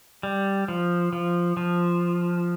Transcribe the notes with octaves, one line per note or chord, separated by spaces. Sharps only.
G3
F3
F3
F3